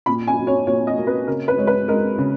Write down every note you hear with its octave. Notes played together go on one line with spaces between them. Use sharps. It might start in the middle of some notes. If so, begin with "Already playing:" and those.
A#2 B5
G#5
F#3
C#5
A#2 C#5
D#5
A#3
B4
C#3 A#4
B4
G#3 C#5
B4
G#3 A#4
C#3